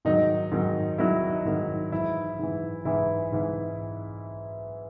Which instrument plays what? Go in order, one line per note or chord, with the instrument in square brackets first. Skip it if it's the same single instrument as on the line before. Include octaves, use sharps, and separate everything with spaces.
[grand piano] G#2 D#3 F#3 D#4
G#2 D#3 F#3
G#2 D#3 F#3 E4
G#2 D#3 F#3
G#2 E3 E4
G#2 E3
G#2 E3 E4
G#2 E3